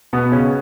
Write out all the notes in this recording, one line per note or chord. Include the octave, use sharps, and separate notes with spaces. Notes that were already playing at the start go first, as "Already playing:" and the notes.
B2 B3
C#3 C#4